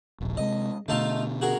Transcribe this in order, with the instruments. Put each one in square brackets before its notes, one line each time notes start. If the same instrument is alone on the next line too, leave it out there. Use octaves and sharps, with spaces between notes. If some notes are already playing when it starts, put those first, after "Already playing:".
[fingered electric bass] D#1 A#1
[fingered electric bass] C3 G3 G#3 [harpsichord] D#5
[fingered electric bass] B2 D3 [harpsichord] A3 D#4 F4
[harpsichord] F#4 G#4 A#4